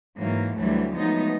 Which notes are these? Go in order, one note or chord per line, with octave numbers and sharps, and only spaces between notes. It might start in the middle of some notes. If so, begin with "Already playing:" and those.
G#2 E3 F#3 A#3
D2 E3 F#3 G3 A3
F3 F#3 G#3 A3 B3 D#4